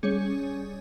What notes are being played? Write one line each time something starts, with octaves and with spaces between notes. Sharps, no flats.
G3 C#4 G#4 C#5